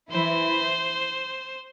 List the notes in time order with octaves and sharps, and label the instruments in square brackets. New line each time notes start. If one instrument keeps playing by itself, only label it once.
[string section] E3 E4 [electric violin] C5